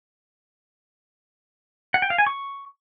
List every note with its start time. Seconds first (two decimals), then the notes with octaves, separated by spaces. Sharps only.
1.94 F#5
2.02 G5
2.10 F5
2.18 G#5
2.27 C#6